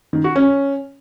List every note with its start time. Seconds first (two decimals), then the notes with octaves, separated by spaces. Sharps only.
0.13 D#3
0.24 F#4
0.36 C#4